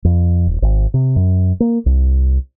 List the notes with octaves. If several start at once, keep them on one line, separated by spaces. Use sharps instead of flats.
F2
D#1
G#1
C3
F#2
A#3
C2